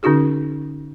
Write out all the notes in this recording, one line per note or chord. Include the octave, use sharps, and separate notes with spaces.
D3 C#4 D#4 F#4 G#4